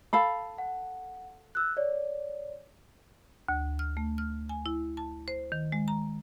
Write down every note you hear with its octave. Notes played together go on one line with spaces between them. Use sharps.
A4 F5 B5
F#5
E6 F#6
C#5 D5
D2
F6
A3
F6
G#5
E4
A5
C5
D#3
G#3
A#5